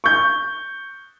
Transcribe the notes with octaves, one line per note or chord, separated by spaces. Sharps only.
C#6 G6